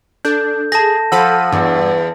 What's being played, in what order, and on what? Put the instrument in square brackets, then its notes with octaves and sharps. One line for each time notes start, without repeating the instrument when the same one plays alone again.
[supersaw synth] D4 [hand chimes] A4 G6
[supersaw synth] G#4 [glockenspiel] A5 A#6
[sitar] F3 [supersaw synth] A4 B5 D#7 [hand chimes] F#5 E6
[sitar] E2 [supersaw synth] G2